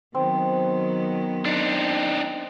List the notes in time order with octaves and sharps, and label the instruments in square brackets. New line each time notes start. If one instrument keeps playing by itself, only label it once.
[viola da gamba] D#3 F#3 B3 [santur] C4
[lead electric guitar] D4 D#4